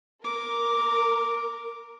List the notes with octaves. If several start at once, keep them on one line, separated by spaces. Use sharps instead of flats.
A#4 D6